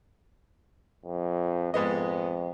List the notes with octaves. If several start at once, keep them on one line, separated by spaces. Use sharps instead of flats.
F2
F2 G#2 B3 D#5